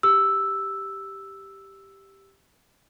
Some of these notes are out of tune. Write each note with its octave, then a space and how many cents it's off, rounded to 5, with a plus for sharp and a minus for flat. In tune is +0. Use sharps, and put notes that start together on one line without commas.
G4 +0 E6 +0